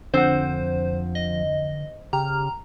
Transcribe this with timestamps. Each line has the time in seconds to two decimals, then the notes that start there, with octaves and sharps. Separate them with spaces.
0.14 F2 D3 F3 C4 C5 F#5
1.15 D#5
2.13 C#3 G4 A#5 F6